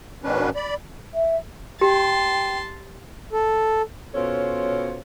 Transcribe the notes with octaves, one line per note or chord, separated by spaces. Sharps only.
G#2 B2 D#3 C#4 D4 B4
D5 B5
E5
G4 G5 A5 C6
A4
B2 C#4 F4 A4 C5 C#5